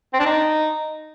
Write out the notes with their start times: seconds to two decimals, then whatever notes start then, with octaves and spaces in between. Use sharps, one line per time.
0.13 C4
0.20 D4
0.26 D#4